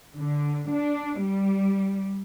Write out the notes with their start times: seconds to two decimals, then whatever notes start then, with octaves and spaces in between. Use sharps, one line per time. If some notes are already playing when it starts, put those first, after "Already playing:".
0.17 D3
0.71 D4
1.20 G3